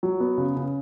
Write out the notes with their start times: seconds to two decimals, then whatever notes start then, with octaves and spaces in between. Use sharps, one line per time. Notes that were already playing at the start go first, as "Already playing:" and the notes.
0.03 F#3
0.20 B3
0.38 C#3
0.57 C#3